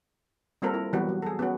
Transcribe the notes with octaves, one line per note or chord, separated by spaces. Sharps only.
G3 A#3 C4 F4 A4 A#4
E4
E3 F#3 G3 B3 F#4
G3
G#4 A4
B3 C#4 F#4